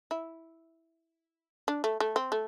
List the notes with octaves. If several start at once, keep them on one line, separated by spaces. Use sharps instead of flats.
E4
D4
A3
A3
C4
A3